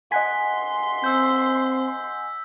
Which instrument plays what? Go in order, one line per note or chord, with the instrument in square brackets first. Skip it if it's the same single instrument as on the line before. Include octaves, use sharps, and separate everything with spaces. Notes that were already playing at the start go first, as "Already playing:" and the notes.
[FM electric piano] D#5 F#5 G#5 [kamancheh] C6 [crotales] B6
[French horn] C4 [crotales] E6 G6